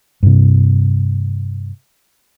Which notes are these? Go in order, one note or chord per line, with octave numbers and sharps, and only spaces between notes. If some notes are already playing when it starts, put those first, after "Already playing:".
G2 C3